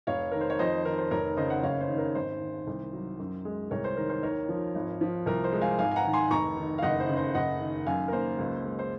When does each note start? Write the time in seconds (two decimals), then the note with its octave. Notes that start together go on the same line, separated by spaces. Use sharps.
0.07 F1 C#5 F5
0.32 D#3 A#4
0.41 C5
0.50 C#5
0.59 F2 C5 D#5
0.85 D#3 A#4
0.98 C5
1.11 F1 A#4 C#5
1.37 C#3 C5 D#5
1.50 D#5 F#5
1.63 F#1 C#5 F5
1.81 C5
1.89 D#3
1.98 A#4
2.15 G#1 C5
2.41 D#3
2.67 C2
2.93 F#3
3.19 F#2
3.45 G#3
3.71 C2 A#4 C#5
3.84 C5
3.97 D#3 A#4
4.10 C5
4.23 D#2 A#4 C#5
4.49 F3
4.75 G#1
5.01 F3
5.26 C2 A#4
5.44 C5
5.53 G#3
5.61 F5 G#5
5.79 G#1 F5 G#5
5.91 G#5
5.96 F#5 A#5
6.05 D#3
6.13 G#5 C6
6.31 F1 A#5 C#6
6.57 D#3
6.78 F5
6.83 F#1 D#5 F#5
7.00 C5
7.09 C#3
7.17 C5
7.35 F#1 D#5 F#5
7.61 D#3
7.86 F#2 F5 G#5
8.08 A#4
8.13 A#3 C5
8.38 C#2
8.64 G#3
8.79 C5